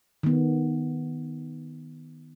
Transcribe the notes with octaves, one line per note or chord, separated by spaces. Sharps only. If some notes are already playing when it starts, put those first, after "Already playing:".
D#3 B3